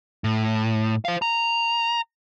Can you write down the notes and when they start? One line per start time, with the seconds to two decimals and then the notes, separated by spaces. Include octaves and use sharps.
0.24 A2
1.05 C5 F5
1.22 A#5